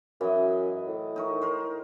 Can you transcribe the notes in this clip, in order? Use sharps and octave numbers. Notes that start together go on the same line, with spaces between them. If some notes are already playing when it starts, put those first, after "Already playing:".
F#2 E3 D#5
A2
D#4 A#4 C#5
A#4 C5